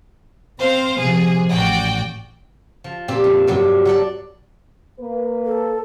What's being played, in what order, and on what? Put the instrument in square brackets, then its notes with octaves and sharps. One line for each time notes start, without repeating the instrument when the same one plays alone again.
[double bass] C4 [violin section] C5 F5
[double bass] C3 F3 [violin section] G#4
[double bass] A1 [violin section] F#4 D5 G5
[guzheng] F3
A#2 C4 G4
F2
G2 C3 F#3 G4
F#3 A4 D5
[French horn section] A#3 B4
[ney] A4